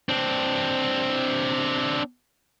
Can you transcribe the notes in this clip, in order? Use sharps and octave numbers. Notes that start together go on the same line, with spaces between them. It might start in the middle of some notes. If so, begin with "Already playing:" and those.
C4 D4